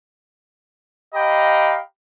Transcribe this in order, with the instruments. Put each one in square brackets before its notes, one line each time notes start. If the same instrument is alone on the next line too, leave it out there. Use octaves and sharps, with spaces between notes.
[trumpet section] G4 D#5 F5 G5 A#5 B5